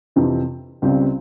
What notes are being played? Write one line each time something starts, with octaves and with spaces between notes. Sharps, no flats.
F2 C3 E3
C#2 C#3 G3 C4